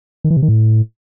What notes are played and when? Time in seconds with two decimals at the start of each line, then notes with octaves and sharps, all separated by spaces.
0.24 D#3
0.30 E3
0.36 C3
0.42 D#3
0.49 A2